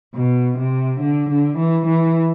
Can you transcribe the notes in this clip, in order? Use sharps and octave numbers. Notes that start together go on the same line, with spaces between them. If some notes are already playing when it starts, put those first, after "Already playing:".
B2
C3
D3
D3
E3
E3